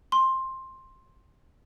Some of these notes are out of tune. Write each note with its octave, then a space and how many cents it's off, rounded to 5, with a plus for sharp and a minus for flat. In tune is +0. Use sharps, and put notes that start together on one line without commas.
C6 +15